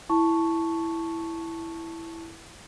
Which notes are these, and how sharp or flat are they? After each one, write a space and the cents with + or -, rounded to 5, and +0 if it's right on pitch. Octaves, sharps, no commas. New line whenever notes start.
E4 +0 A5 +0 C#6 +0